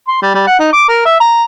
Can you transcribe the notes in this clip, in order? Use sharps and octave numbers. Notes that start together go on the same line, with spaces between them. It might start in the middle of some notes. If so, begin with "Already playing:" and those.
C6
G3
G3
F#5
D#4
D6
A#4
E5
A#5